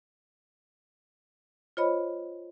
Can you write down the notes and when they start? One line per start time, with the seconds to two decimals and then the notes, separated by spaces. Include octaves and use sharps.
1.77 F4 C5 C#5 D#5 B5